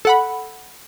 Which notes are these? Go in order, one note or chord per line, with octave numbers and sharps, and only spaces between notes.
A4 F#5 B5